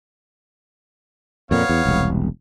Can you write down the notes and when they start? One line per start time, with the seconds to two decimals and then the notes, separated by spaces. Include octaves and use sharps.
1.51 F2 A#2 B3 C#5 F5
1.69 E2
1.85 E1 C2